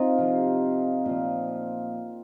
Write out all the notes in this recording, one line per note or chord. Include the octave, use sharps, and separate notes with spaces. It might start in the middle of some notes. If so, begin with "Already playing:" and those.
Already playing: C4 D#4 F4
C3 F3
A#2 F3